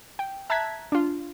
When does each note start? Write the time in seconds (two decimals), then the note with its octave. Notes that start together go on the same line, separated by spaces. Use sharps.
0.19 G5
0.50 E5 A5 A#5 F#6 G#6 B6
0.92 D4 F4